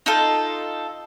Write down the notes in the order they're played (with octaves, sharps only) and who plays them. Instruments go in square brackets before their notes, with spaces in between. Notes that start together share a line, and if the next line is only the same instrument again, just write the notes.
[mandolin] D#4 F4 A4